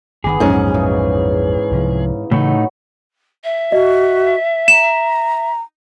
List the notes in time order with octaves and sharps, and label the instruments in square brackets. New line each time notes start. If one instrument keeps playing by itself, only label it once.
[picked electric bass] G1 A#2 D#3 [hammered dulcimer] B3 B5 D6 [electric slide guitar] G#4
[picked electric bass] A#1 F2 F#3 [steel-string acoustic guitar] G#2 C#4
[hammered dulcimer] C#3 E3 D#4
[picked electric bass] C2 C3 F3
[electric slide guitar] A2 A3 D#4 [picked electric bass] C#3 E3 [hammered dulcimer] F#3 B5
[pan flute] E5
[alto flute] F#4 [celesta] D#5
[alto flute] A#5 [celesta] E7